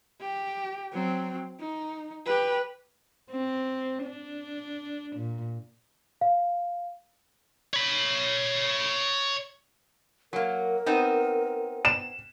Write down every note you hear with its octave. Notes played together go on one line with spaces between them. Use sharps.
G4
F#3 C4
D#4
G4 B4
C4
D4
A#2
F5
C#5 B5
F#3 A#3 A#4
B3 C4 D#4
E7